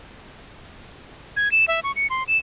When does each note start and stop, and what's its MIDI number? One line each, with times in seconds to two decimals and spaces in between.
1.37 1.51 92
1.52 1.65 100
1.68 1.80 76
1.84 1.92 85
1.96 2.07 97
2.10 2.24 84
2.28 2.37 100